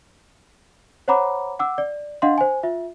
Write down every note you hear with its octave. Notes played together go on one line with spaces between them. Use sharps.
C5 C#5 F#5 A#5 B5 D6
F#5 D6 E6
D5
D4 D#5 F5 F#5 C6
C5 G#5
F4 E5